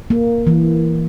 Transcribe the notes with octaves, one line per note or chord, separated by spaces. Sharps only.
A#3
E3